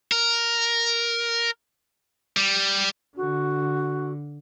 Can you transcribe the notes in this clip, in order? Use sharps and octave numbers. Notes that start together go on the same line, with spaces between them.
A#4
G3
D3 F#4